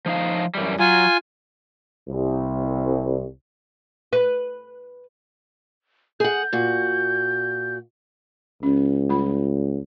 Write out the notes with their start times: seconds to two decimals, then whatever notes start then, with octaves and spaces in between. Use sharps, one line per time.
0.06 F3 D#4 F5
0.55 F#2 E3 G3
0.80 F#3 F4 G#5
2.08 C2
4.13 B4
6.20 G#4 F#5 G6
6.53 A#2 F#4
8.63 C#2 C#4
9.09 G3 F4 B5